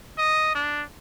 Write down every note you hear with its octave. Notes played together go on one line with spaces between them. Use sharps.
D#5
D4